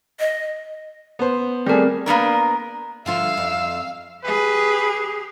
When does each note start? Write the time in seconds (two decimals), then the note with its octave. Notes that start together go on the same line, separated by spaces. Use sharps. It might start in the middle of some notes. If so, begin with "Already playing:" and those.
0.19 D#5
1.19 B3 C5
1.66 G3 A3 C4 G#4 A#4
2.06 A#3 B3 D4 A#4
3.06 D3 F3 F4 E5 F5 E6
3.37 F2
4.24 G4 G#4 B4